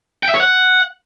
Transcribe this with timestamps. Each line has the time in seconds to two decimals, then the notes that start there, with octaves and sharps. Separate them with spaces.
0.23 G5
0.29 E5
0.34 C#5
0.40 F#5